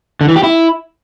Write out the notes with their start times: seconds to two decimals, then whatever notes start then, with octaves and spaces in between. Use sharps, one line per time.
0.21 D3
0.28 E3
0.36 G4
0.43 E4